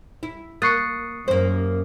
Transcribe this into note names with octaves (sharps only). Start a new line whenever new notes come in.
E4
A#3 C#6 D#6 F#6 A6 C7 C#7
F#2 A#3 C5